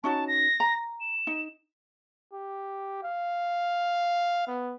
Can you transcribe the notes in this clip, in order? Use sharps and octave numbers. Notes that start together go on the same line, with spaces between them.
C#4 D#4 F#4 A5
A#6
A#5
E7
D#4
G4
F5
B3